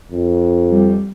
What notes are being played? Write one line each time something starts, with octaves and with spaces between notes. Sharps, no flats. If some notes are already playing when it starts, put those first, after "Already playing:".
F2
G3